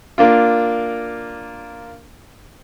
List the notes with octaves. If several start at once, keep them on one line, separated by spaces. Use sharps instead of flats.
A#3 D4 F4